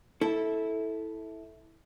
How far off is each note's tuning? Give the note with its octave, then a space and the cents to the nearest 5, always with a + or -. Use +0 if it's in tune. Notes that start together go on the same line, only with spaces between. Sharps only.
E4 -15 A4 -5